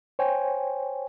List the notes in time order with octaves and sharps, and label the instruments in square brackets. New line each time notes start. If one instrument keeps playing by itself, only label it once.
[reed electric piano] C5 C#5 G5 G#5